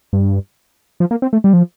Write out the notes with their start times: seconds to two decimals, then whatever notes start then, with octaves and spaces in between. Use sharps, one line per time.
0.13 G2
1.00 F3
1.11 A#3
1.22 C4
1.33 A3
1.44 G3
1.53 F3